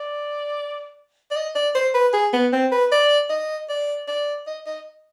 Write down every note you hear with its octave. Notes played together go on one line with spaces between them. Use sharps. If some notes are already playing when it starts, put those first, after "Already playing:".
Already playing: D5
D5
D#5
D5
C5
B4
G#4
B3
C4
B4
D5
D#5
D5
D5
D#5
D#5